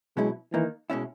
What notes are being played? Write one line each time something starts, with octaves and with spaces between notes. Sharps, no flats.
B2 F#3 G#3 C#4 E4
D#3 E3 A#3 D#4
B2 G#3 C#4 E4